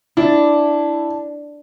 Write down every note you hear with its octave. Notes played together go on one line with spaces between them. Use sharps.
D4 E4